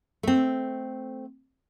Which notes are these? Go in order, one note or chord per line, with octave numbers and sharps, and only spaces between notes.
A3 C4